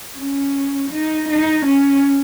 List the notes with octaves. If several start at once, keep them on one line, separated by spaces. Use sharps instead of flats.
C#4
D#4
D#4
C#4